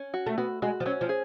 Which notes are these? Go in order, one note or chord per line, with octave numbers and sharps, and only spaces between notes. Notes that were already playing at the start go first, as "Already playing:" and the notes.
Already playing: C#4
F#4
A3
B3 F#4
G#3 F#4
F3
F#3 C#4
F3
G#4